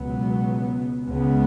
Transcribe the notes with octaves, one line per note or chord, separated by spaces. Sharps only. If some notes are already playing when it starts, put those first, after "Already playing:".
Already playing: C#2 B2 F#3 B3
C#2 C#3 G#3 B3